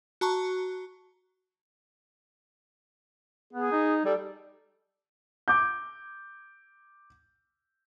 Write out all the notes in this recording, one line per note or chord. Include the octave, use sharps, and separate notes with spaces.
F#4 A5 A#5 C#6
B3 G#4
D#4
G3 A4
D6 G6